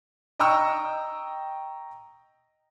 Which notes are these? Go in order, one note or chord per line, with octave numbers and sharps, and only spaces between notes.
D#5 G5 A#5 C#6 E6